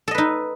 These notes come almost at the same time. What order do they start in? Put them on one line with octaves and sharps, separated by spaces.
A4 D#5 B4 D#4